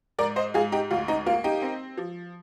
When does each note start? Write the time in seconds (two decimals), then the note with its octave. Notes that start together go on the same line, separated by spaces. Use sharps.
0.19 G#2 A#4 D5
0.36 C5 D#5
0.54 G#2 F4 G#4
0.72 D#4 G4
0.91 D2 F4
1.08 D#4
1.26 A#3 F4
1.44 D#4 G4
1.62 C4
1.98 F3